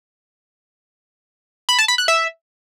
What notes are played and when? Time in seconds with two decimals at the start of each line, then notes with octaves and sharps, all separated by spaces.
1.69 B5
1.79 A5
1.88 B5
1.98 F#6
2.08 E5